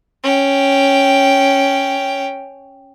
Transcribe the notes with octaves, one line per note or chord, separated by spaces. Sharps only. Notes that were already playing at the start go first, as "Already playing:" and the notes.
C#4 G5